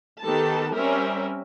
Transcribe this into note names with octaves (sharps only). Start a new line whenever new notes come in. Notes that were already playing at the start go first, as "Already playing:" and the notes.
D#3 B3 G4 A4 A5
G3 C4 C#4 A#4 E5